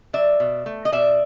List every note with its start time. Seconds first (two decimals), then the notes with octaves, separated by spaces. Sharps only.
0.13 F#3 D5 E5
0.40 B2
0.66 A3
0.85 D#5
0.92 B2 D5 E5